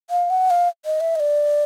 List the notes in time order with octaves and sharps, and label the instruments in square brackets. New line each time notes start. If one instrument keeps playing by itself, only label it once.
[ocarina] F5
F#5
F5
D#5
E5
D#5
D5